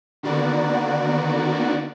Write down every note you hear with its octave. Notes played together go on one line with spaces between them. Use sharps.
D3 D#3 A#3 B3 F#4 D5